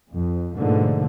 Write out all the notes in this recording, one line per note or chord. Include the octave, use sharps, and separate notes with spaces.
F2
G#2 B2 D3 F3 A3 A#3